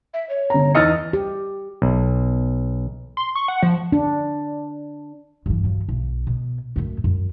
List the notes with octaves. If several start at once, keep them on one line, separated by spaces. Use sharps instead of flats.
E5
C#5
G1 A#5
E2 D#4 D#5 E6 F6 A6 C#7
G4
B1
C6
C#6
F#5
F3
D4
G2 E3
C#3 F#3
B1
B2
F#2 A3
F#2